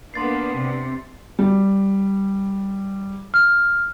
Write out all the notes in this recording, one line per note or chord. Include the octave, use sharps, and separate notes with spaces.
A#3 B3 D4 C6 A6 C7
C3
G3
F6